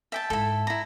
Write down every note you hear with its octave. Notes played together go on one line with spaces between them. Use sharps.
E5 G5 A5
G#2 E4 A4
E4 A#5